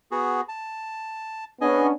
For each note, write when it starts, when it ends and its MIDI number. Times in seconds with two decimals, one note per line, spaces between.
0.11 0.41 59
0.11 0.41 66
0.11 0.41 68
0.49 1.44 81
1.61 1.91 59
1.61 1.91 61
1.61 1.91 62
1.61 1.87 68
1.61 1.87 75
1.61 1.87 80